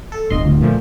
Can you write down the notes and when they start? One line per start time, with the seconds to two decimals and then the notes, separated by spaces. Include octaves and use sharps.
0.12 A4
0.30 D1 G1 D#5 C6
0.45 D2
0.61 A#2 F3 A3